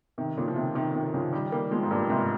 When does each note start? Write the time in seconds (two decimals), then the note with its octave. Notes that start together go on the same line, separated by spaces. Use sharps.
0.18 C3 D#3
0.37 A#2 C#3
0.48 F3
0.56 C3 D#3
0.75 C3 D#3
0.95 C3 D#3
1.14 C#3 F3
1.33 D#3 G3
1.52 G3 A#3
1.71 F3 G#3
1.83 G#2
1.90 G2 A#2
2.09 G#2 C3